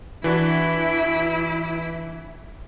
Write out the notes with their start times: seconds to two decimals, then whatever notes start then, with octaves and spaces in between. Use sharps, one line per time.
0.24 E3 D4 E4 F#4